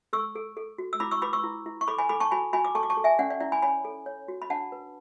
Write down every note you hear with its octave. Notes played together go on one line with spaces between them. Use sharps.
A4 C#6 E6
A4
A4
F#4
E6
E4 B5 D6
C#6 E6
B4 B5 D6
C#6 E6
E4
E4
C#6
A4 B5 D6
G#5 B5
A4 B5 D6
A5 C#6
F#4 G#5 B5
F#4 G#5 B5
D6
A4 A5 C#6
D6
A5 C#6
A4
E5 G#5
C#4 D5 F#5
D5
E4 D5
G#5 B5
C#5 G#5 B5
A4
C#5
F#4
B5
D4 F#5 A5
B4